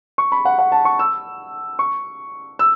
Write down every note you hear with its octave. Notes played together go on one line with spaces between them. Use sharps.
C#6
B5
F#5
F#5
A5
C#6
E6
C#6
E6